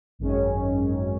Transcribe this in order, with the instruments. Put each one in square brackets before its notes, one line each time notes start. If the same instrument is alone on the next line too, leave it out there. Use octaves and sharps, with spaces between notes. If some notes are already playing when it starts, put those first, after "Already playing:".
[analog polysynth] G#1 F#2 D#3 G#3 C#4